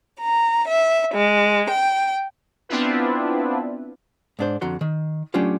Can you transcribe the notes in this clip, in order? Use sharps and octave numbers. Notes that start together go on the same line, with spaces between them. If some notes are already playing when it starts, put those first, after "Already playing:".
A#5
E5
G#3
G5
B3 C4 D4 E4 F4 B4
G#2 D4 C5
F2 D3 F#4 A#5 C6
D#3
F#3 A3 C#4 D4 F4 G4